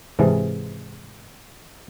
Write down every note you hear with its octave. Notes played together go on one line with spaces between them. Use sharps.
G#2 C3 E3 G#4 A5